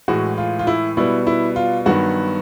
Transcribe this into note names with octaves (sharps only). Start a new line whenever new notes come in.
A2 E3 G#3 F#4
F4
F4
E4
B2 G3 B3 E4
E4
F4
G2 D#3 F#3 B3 F#4